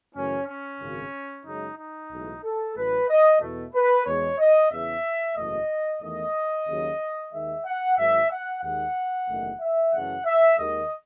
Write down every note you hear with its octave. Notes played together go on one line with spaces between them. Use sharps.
F#2 C#3 E3 A3 C#4
C#4
G#1 F#2 C#3
F#2 C#3 G#3 D#4
D#4
B1 A2 E3 G#3
A4
A1 A2 F#3 A3 B4
D#5
E2 B2 A3
B4
E2 B2 G#3 C#5
D#5
E2 C#3 E3 E5
F#1 E2 B2 A3 D#5
E2 D#3 A3 D#5
D#2 C#3 F#3
D#2 D#3 G#3 E5
F#5
G#1 G#2 D#3 F#3 E5
F#5
D#2 D#3 G#3 F#5
F#1 E2 D#3 A3
E5
F#2 C#3 E3 A3 F#5
E5
D#2 D#3 G#3 D#5